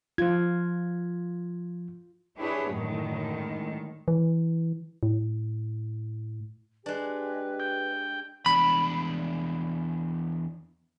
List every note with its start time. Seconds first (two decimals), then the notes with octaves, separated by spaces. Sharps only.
0.18 F3 F4 G#6
2.37 D4 E4 G4 G#4 B4 C#5
2.70 F#2 A2 D3 D#3 G#3
4.08 E3
5.03 A2
6.86 G#3 D4 G4 B4
7.60 G5
8.46 E2 D4 B5